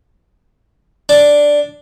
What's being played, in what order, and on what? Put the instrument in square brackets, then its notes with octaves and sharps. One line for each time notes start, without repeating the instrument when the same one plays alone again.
[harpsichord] D4